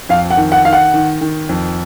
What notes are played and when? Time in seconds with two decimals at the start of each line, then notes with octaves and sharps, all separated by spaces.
0.09 F2 F5
0.30 F#5
0.37 D#3
0.52 F#5
0.65 D#3 F5
0.73 F#5
0.94 D#3
1.21 D#3
1.49 F2